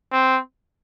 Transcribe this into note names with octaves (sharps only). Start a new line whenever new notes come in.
C4